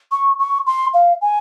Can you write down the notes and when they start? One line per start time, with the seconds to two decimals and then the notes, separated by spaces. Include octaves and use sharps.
0.12 C#6
0.39 C#6
0.67 C6
0.94 F5
1.22 G#5